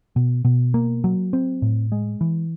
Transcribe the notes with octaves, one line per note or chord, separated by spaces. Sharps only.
B2
B2
A#3
F#3
C4
A2
G#3
E3